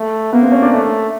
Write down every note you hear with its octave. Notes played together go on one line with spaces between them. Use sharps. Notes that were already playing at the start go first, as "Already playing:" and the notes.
Already playing: A3
A#3 B3
C4
C#4
D4
A3